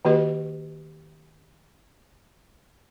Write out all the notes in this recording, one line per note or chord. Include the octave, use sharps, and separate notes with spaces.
D#3 A#3 F#4 G4 B4 D#5